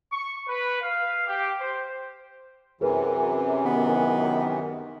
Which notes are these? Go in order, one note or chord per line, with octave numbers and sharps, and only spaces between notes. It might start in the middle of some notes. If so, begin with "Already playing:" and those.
C#6
B4
F5
G4
C5
F#2 C3 E3 G#4 A#4 B4
D#3 B3